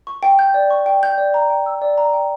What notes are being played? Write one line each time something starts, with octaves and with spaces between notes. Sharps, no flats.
C#6
G5
G6
D5
C#6
G5
G6
D5
A#5
G5
E6
D5
A#5
G5